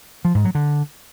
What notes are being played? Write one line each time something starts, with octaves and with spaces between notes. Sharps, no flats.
F3
G#2
F#3
D3